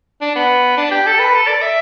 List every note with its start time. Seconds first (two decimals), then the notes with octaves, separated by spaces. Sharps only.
0.21 D4
0.35 B3
0.77 D4
0.91 G4
1.06 A4
1.19 B4
1.34 A4
1.47 D5
1.62 E5